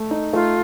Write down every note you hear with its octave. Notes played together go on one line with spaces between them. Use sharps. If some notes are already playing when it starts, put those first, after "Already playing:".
Already playing: A3
D#4
A3 F4